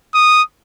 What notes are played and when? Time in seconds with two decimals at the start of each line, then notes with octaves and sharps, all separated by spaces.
0.14 D#6